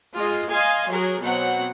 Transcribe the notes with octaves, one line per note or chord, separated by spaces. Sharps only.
G#3 F4 G#4 D#5
D#5 F5 G#5 C6
F#3 G#4 A#4
B2 F#3 C4 F#5